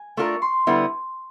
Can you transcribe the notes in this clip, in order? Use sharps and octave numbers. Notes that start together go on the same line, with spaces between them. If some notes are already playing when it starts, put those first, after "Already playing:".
Already playing: G#5
A3 D4 F4 A#4 C#6
C6
D3 G3 B3 E4